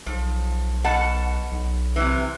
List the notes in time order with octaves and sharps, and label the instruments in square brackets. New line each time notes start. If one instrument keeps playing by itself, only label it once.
[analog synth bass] B1 [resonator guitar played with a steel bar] F3
[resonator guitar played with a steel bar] B2 F#5 A5
[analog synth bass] B1
[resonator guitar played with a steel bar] C3 E3